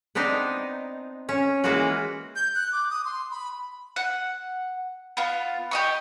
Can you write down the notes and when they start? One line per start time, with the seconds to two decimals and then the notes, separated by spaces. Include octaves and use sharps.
0.15 B3 C4 D4 D#4
1.29 C#4
1.64 E3 G#3 A#3 F4 F#4
2.35 G6
2.55 F#6
2.72 D6
2.91 D#6
3.05 C6
3.31 B5
3.96 F#5
5.17 B3 F4
5.71 G4 D#5 C#6